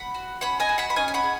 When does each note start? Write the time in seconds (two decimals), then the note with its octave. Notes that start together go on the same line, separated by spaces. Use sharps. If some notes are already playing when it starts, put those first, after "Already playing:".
Already playing: F#5 B5
0.14 F#4
0.41 C#4 F#5 B5
0.60 D#5 G#5
0.69 F#4
0.78 F#5 B5
0.90 B5
0.96 C#4 D#5 G#5
1.08 G#5
1.14 F#5 B5
1.23 G#4